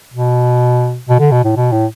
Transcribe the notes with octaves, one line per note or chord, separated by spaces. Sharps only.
B2
B2
D3
B2
A2
B2
A2